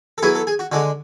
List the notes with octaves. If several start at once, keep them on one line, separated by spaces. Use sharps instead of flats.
A4
F#3 B3 E4 G#4
A4
G#4
F#4
D3 G#3 D4 F#4